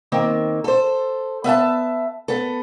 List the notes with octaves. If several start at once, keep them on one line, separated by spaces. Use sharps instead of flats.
D#3 A#3 C4
A4 C5
B3 E5 F#5 A5
B3 A4